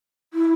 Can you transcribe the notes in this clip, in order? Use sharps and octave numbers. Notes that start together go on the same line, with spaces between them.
E4